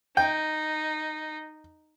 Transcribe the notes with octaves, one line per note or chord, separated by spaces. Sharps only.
D#4 G5